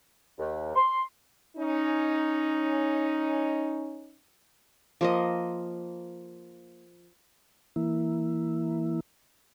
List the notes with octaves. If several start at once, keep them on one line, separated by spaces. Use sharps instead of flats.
D#2
C6
C#4 D#4
F3 A#3 D#5
E3 A#3 E4